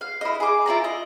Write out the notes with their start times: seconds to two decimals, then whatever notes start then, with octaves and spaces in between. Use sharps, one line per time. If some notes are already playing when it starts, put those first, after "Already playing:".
0.01 F5
0.21 E4 D#5
0.40 G#4 D6
0.66 E4 F4 D5 A#5
0.84 D#5